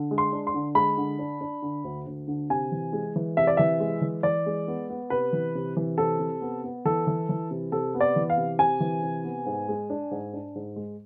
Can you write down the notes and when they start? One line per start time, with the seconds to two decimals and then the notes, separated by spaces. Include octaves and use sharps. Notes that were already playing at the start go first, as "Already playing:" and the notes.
Already playing: D3
0.11 G#3
0.18 C6
0.32 D4
0.47 C6
0.54 D3
0.75 G#3 B5
0.97 D3
1.19 D4
1.41 D4
1.62 D3
1.84 D2
2.07 D2
2.28 D3
2.50 C3 G#5
2.72 E3
2.93 G#3
3.16 E3
3.37 C3 E5
3.47 D5
3.57 E3 E5
3.80 G#3
4.02 E3
4.23 E3 D5
4.46 G#3
4.68 B3
4.90 B3
5.10 C3 B4
5.33 E3
5.55 C3
5.77 E3
5.98 C3 A4
6.19 C3
6.41 B3
6.64 B3
6.85 E3 A4
7.07 E3
7.29 E3
7.51 C3
7.72 C3 A4
7.94 B3
8.01 D5
8.16 E3
8.30 F5
8.37 C3
8.59 C3 G#5
8.80 E3
9.03 C3
9.24 B3
9.46 G#2
9.69 G#3
9.90 D4
10.11 G#2
10.33 D4
10.55 G#2
10.76 G#3